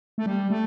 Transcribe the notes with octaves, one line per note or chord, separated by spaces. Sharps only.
A3
G3
A3